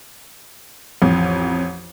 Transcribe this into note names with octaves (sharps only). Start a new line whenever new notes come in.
A1 F2